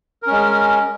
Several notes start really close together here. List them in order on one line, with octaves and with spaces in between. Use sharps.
A#4 C#4 G#3